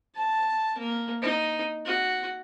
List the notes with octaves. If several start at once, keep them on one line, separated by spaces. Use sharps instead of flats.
A5
A#3
D#4
F#4